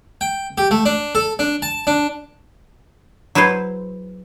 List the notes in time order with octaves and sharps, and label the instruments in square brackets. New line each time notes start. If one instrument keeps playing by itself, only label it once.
[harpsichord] G5
G4
A3
D4
A4
D4
A5
D4
[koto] F#3 E4 G#4 B4 C5